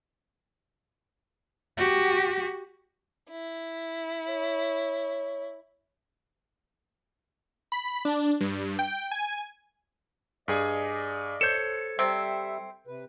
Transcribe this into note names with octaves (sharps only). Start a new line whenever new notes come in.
F#4 G4
E4
C#5
B5
D4
G2
G5
G#5
G2 G#4 D5 D#5 G#5
A4 C5 C#5 G6 E7
C3 G3 C4 E5
C3 B4